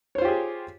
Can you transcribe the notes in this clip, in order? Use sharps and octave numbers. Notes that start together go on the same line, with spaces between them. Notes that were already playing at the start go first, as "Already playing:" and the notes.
F4 G4 G#4 C5 C#5